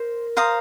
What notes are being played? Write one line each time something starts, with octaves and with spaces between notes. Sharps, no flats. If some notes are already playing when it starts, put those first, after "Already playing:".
Already playing: A#4 C5
C5 F5 A#5 D#6